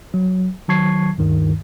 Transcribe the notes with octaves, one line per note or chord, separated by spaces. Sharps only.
F#3
D#3 F#3 A5 C#6 G#6 C7
D2 G2 D#3